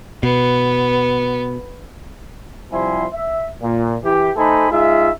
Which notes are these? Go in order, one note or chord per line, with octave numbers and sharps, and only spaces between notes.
B2 B3
C3 F3 G3 E4 G#5 C6
E5
A#2
E3 G4
A3 D#4 A4 C5 G#5 B5
G#3 D#4 F4 G#4 E5